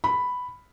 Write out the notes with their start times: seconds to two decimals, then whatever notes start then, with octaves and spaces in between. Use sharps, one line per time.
0.04 B5